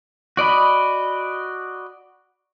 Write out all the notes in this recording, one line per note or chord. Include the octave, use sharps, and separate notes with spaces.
F#4 D5 D#5 B5